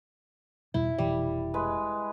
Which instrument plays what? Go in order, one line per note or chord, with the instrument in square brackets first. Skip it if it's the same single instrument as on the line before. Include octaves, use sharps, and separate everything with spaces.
[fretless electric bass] E2 B2 G3 [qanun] E4
[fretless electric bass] F1 B2 E3 [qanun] G3
[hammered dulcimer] G#3 B4